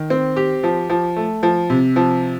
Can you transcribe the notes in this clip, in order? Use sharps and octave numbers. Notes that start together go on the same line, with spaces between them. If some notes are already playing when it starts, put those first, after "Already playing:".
Already playing: D#3
C4
G4
F3
F3
A3
F3
C3
F3